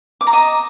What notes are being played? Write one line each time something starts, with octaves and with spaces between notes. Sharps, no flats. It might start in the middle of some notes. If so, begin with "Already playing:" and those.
D6
A#5
D#5